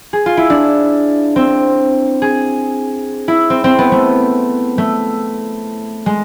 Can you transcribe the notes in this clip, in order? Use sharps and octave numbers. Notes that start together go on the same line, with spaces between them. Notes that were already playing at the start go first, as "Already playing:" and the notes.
G#4
F4
E4
D4
C4
G#4
E4
C4
C4
B3
A3
A3
G#3